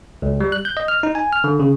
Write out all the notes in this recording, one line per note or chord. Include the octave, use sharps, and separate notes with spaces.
C#2
G3
F#6
G6
D#5
F6
D#4
G#5
F6
D3
C#3